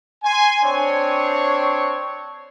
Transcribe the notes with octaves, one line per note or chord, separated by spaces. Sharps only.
G#5 C6
C4 D4 C#5